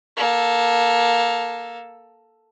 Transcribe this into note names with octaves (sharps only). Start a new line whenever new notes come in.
A#3 A4